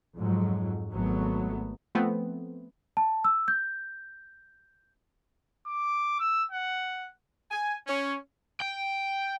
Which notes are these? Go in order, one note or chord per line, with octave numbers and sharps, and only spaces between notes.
F2 G#2 F#3
G#1 F#3 A3 B3
F3 A3 B3 C4
A5
E6
G6
D6
E6
F#5
G#5
C#4
G5